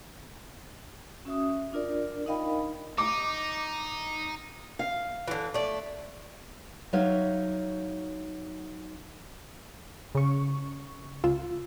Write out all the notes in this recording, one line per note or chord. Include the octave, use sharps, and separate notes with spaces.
C#4 F#4 E5 D#6
D4 F4 A#4 D5
D#4 A#4 D#5 F5 G5 B5
D#4 D6
F5
D3 E3
A3 D5
F#3 D#4 C#5 E5 F5
C#3 C#6
C#2 F4 E6